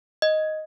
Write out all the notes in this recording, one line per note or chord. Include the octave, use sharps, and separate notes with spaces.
D#5